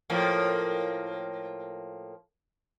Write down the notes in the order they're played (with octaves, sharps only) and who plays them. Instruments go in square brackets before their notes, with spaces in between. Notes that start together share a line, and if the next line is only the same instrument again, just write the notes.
[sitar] A2 F3 A#3